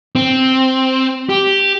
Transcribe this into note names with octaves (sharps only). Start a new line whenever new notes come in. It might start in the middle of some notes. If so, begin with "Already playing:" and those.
C4
G4